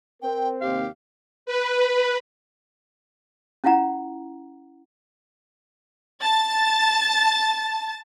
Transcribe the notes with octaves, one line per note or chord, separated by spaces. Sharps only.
C4 A#4 G5
D#2 C3 G4 F5
B4
C#4 E4 F4 F#5 A#5
A5 A6